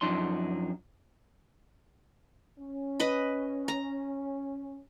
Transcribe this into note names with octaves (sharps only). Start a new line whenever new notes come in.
F#2 F3 D4 D#4 C6
C#4
B4 D#5 B5
A#5